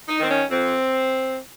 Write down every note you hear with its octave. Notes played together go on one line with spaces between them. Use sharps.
D#4
D#3 C4
C#4
F2 C4